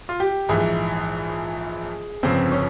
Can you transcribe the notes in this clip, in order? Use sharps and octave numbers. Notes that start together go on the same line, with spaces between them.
F4
G4
A#1 G#2 E3 G#4
G1 F2 C#3 C4
C#4